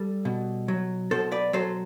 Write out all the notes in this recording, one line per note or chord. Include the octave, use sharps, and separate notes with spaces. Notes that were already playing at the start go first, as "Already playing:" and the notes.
Already playing: G3 A4
B2
F#3
B2 A4 C5
B4 D5
F#3 A4 C5